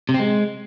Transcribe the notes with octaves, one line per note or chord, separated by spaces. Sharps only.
C3
C4
G#3